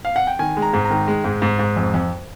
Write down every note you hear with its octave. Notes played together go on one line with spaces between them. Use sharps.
F5
F#5
G5
D#3 G#5
G#3
A#5
G#2
A#5
D#3
G#3
G#2
G#2
G#2
F2
F2